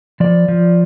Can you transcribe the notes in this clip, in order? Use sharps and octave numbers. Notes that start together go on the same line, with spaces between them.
F3 D5
F3